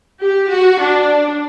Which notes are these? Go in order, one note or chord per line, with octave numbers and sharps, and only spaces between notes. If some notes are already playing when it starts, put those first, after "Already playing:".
G4
F#4
D4